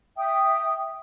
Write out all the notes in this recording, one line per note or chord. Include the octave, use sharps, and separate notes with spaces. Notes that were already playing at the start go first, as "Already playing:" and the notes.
E5 G5 D#6